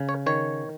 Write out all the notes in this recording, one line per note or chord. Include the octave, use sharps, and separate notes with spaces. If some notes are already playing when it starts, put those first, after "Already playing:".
Already playing: C#3
C#5
D#3 C#5